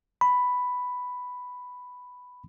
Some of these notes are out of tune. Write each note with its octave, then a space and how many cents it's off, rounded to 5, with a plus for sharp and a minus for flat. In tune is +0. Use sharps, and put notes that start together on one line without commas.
B5 +5